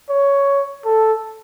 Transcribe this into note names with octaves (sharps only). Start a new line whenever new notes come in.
C#5
A4